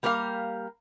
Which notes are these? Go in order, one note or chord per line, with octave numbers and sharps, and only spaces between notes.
G3 A#3 G4 A#4 F5